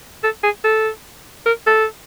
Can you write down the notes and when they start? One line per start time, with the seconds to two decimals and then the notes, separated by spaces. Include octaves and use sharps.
0.23 A4
0.43 G#4
0.64 A4
1.46 A#4
1.66 A4